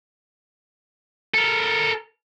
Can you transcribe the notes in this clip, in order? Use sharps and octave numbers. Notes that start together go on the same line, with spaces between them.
A4 A#4